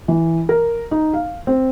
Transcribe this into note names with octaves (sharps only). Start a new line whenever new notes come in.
E3
A#4
D#4
F5
C4